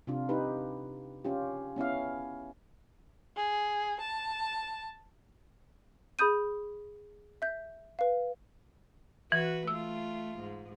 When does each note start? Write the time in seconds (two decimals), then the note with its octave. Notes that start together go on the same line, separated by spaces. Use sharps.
0.07 C3 D4 F4
0.29 D#4 G4 B4
1.24 C#4 F4 G4
1.76 B3 C#4 E4 F5
3.37 G#4
4.00 A5
6.19 G#4 B5 D#6 G6 D#7
7.42 E5 G6
7.99 B4 F5
9.32 E3 F#4 B4
9.67 A3 F4 E6
10.40 G#2